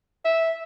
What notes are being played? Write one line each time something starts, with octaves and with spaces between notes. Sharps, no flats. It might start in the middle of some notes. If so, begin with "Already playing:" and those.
E5